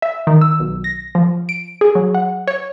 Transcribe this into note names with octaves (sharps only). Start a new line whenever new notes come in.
E5
D#3
E6
B1
A#6
F3
D7
G#4
F#3
F#5
C#5